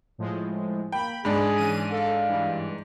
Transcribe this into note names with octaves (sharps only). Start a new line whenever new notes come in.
A2 F3 G#3
A#3 G5 B5
G#2 D4 G#4
E3 C#4 D#7
A4 F5
G2 E3